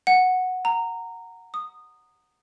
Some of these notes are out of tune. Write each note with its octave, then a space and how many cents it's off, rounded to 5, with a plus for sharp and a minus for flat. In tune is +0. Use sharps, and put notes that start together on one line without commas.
F#5 -5
A#5 -15
D#6 -15